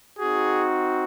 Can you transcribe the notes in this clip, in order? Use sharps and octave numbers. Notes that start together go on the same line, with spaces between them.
C4 D#4 F#4 G#4